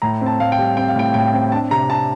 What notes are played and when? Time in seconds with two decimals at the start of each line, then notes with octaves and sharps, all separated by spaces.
0.02 A2 A#5
0.21 C4
0.26 A5
0.40 A2 F5
0.52 G5
0.58 G3
0.77 C4 G5
0.88 F5
0.96 A2 G5
1.14 A2 G5
1.34 C4
1.52 D4 A5
1.71 C3 A#5
1.89 D4 A5